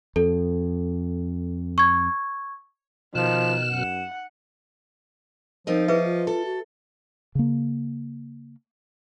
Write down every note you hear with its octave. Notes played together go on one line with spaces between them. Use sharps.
F2 A4
C#6 G#6
B2 D#3 F3 F6 F#6 E7
F#2 F#5
F3 C4 D#4 A#4 D#5
E4 G#4 B4 D#5 E5
F4
A4
F#4
C#3 A#3